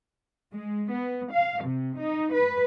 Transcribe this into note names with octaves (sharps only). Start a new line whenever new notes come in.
G#3
B3
F5
C3
D#4
B4